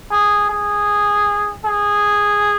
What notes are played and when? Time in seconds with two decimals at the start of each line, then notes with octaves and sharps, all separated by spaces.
0.12 G#4
0.50 G#4
1.65 G#4